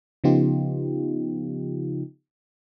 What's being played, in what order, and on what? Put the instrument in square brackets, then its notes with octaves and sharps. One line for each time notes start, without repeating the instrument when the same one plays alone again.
[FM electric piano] C#3 F3 B3 D#4 F4 G4